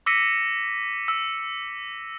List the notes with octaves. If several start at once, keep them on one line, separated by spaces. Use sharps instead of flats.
D6 E6 A#6 B6 C#7 D#7
E6